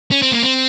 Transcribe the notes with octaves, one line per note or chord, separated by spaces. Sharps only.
C#4
C4
A#3
C4